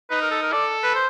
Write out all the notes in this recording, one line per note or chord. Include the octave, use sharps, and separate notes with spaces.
D#4 B4
A#4
A4
A#4
A4 D5
B4
C5